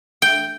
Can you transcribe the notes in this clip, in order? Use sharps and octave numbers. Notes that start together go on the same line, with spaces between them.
G5